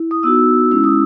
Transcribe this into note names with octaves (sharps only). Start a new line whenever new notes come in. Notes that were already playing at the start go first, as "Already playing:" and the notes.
Already playing: E4
D#6
B3 D#4 F#4 E6
G#3 C#4 E4 E6
D#6